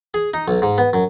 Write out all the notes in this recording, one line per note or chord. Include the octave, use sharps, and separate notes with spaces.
G#4
D#4
B1
G#2
B3
F#2